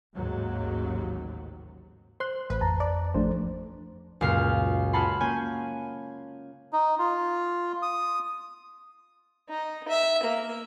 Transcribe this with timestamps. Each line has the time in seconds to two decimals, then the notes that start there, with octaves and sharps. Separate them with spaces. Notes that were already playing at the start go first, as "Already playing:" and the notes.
0.16 A1 D#2 G#2 C#3 F#3
2.20 C5 C6 F#6
2.50 A1 B4
2.61 F2 A5 A#5
2.80 D5
3.14 A1 F3 A3 D4 C5
4.21 C#2 F#2 A#2 F5
4.93 G#4 F5 F#5 A5 B5 C6
5.20 A#3 C#4 G#5 G6
6.73 D#4
6.99 F4
7.82 D#6
9.49 D#4
9.88 E5
10.23 A#3